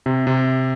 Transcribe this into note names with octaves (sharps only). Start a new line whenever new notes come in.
C3
C3